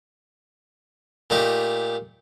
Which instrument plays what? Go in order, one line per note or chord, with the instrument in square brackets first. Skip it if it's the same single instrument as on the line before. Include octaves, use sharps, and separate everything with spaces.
[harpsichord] A#2 A3 D#4 G4